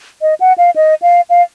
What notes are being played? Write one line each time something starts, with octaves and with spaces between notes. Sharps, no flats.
D#5
F#5
F5
D#5
F5
F5